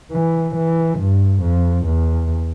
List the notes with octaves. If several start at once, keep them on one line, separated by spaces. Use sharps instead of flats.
E3
E3
G2
F2
E2